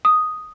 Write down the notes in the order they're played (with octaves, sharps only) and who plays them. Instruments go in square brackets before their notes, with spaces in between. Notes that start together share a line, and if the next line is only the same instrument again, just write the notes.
[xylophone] D#6